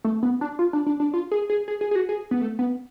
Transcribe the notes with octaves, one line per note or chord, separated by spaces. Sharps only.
A3
B3
D4
F4
D4
D4
D4
F4
G#4
G#4
G#4
G#4
G#4
F#4
G#4
B3
A3
B3